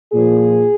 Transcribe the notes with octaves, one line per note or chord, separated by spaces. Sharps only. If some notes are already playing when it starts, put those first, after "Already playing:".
A#2 F3 G#4